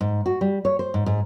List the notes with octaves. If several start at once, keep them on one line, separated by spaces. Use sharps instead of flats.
G#2
F#4
G3
C#5
C5
G#2
G#2